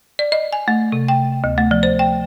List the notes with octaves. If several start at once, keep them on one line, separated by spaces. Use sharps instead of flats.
D5
D#5
G#5
A3
C3
G5
D2
A3
F3
C5
G5